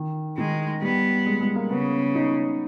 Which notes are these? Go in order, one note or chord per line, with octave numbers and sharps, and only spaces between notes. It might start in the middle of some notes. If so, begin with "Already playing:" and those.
Already playing: D#3
D#3 G#3
G3 B3
G#3
G#3
A#3
C#3 B3
D#4